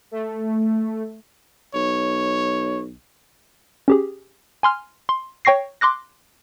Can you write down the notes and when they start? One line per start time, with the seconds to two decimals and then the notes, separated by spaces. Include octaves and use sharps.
0.11 A3
1.74 B1 C#5
3.88 C#4 G4 G#4
4.63 G#5 C6 F6
5.09 C6
5.45 C#5 G5 C#6 A#6 C7
5.81 C6 D6 F#6 A#6